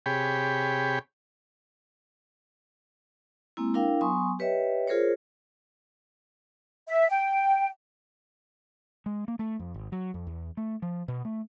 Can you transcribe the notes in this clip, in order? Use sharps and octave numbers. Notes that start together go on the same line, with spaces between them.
C3 G4 G#4 C#5 G5 B5
G#3 A#3 C4 E4
D4 E4 A#4 F5 G5
F#3 B3 G#5 C6 C#6 D#6
G4 B4 C#5 D#5 E5 G5
F4 G#4 A#4 C5 C#5
E5
G5
G#3
A#3
A3
F2
G#1
F#3
F2
E2
A3
F3
B2
A3